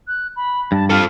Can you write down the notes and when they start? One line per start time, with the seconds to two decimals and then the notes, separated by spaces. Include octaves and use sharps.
0.07 F#6
0.36 B5
0.72 G2 A5
0.90 F4 A4 F6